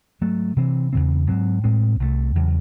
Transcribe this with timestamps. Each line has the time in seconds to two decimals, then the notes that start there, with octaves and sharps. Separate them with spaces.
0.21 G#2 F#3 A3
0.56 C3 E3 C4
0.93 E2 C#3 E3 C4
1.28 G#2 F#3 C4
1.64 A2 G#3 C4
2.00 C2 C3 F#3 A3
2.35 E2 C#3 F#3